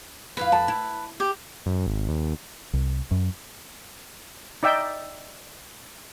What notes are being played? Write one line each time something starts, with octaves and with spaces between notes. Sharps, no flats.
F2 E4 F4 B4
F2 A5
E4
G4
F#2
G#1
D#2
C2
F#2
D#4 D5 E5 G5